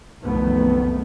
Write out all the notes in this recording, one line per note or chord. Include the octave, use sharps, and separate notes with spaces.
F#1 C2 F2 D#3 A3 B3